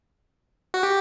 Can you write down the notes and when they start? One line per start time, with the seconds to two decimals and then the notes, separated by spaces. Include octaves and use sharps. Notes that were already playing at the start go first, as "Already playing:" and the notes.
0.74 F#4
0.83 G4